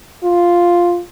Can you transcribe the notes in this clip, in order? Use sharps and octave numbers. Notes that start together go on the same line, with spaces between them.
F4